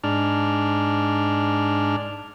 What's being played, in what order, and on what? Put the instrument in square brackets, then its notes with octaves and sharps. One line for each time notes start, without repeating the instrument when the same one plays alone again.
[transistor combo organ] G#2 D4 F6